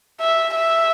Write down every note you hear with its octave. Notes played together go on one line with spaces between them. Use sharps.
E5
E5